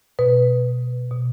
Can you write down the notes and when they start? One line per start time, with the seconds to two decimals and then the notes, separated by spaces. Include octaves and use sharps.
0.19 B2 B4
1.11 B2